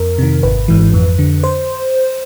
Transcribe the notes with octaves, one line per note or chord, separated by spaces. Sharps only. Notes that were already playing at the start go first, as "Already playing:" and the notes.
Already playing: F2 A#4
C3 D#3
G#1 B4
G#2 E3
F2
D3
C5